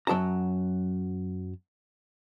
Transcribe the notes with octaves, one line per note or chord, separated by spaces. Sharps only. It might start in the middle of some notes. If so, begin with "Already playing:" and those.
F#2 F#3 G#4 A5 A#5